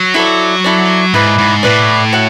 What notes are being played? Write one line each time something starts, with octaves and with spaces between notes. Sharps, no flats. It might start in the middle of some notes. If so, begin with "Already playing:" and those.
Already playing: F#3
E4 A4 D5
E4 A4 D5
G#2 E4 B4 D5
G#2
A2 E4 B4 D5
F#4 C#5 E5